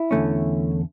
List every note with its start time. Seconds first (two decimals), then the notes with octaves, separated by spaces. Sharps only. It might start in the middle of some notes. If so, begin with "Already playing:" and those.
Already playing: E4
0.11 E2 D3 A3 C#4